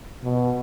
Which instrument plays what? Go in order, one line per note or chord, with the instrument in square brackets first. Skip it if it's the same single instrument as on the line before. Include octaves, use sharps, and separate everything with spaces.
[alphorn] B2